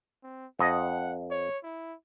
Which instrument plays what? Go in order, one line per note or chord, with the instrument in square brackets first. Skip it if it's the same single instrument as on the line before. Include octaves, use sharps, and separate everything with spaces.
[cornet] C4
[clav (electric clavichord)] F2 D#5 [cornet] F#5
[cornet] C#5
E4